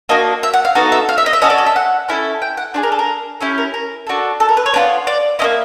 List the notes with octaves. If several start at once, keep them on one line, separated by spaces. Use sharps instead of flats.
A#3 D4 F#4 D#5
E5
F#5
F5
B3 D#4 F#4 A4
E5
F5
E5
D#5
E5
C#4 F#4 A4 D#5
D5
D#5
E5
F#5
C#4 E4 A4
G5
F#5
D4 F4 G#4 D5
A#4
A4
A#4
C#4 E4 G4 A4
A#4
A#4
D4 F#4 A4
A4
A#4
B4
C#5
B3 D4 F4 D5
D5
A#3 C#4 E4 D#5